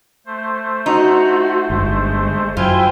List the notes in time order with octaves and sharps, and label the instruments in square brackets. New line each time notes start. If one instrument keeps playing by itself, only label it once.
[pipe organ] A3 C5
[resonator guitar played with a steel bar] D#4 [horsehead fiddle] F#4
[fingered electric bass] G1 G2 [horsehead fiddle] G#3
[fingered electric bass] F#2 F#3 [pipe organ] E4 E5 G#5 [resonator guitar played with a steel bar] F4 [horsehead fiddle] C5 G5